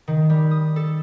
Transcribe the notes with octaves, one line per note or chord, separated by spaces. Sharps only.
D#3
G3
D#6
A4